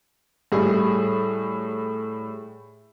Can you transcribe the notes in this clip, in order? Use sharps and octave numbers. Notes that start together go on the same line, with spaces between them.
A2 G3 G#4